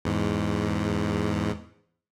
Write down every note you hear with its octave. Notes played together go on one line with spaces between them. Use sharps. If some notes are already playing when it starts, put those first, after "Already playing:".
E2 G#2